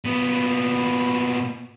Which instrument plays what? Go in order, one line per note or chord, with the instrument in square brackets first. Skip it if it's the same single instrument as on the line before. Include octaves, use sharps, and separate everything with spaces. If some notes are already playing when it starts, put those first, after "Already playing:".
[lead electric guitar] A#2 B3